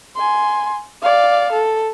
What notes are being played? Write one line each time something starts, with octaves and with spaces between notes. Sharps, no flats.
G#5 C6
D5 F5
A4